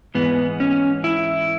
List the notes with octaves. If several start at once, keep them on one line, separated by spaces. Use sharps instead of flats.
G#2 E3 G#3 B3
C#4
E4